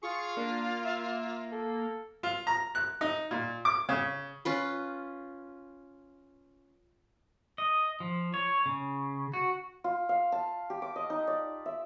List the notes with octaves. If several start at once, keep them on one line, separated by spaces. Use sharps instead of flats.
F4 G#4 C#6
A#3 D4
E5
A4
F4
A#5
F#6
D#4
A#2
D6
C#3
C#4 F4 B4
D#5
F3
C#5
C#3
F#4
F4
F5
A5
G4
D6
D#5
D#4
D5
E5